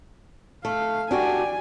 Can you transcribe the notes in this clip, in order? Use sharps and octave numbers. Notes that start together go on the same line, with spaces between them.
A3 F5
D4 F#4 G4 D5 G#5